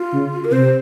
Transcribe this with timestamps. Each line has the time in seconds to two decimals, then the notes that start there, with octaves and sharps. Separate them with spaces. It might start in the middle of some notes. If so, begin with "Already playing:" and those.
Already playing: F4
0.14 C#3
0.44 A#4
0.51 C3 C5